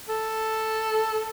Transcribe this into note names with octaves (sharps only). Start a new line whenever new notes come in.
A4